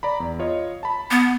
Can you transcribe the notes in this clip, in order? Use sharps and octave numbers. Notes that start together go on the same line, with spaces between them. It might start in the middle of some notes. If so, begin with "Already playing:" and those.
D5 A#5 B5
E2
F4 C#5 D#5
A5 B5
B3